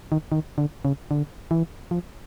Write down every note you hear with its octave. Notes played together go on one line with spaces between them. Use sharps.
D#3
D#3
D3
C#3
D3
E3
F3